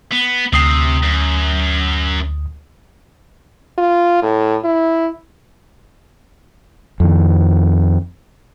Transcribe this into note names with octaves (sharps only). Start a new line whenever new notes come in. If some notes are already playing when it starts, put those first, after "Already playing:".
B3
D2 C3 D#6 C7
F#2
F4
A2
E4
F2 D#3